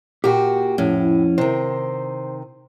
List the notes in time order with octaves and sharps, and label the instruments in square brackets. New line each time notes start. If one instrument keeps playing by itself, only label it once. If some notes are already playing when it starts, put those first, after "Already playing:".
[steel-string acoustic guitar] A#2 F#4 [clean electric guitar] G4 G5
[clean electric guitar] F2 C#4 [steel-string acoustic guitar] A2
[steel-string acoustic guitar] C3 D#3 [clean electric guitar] C5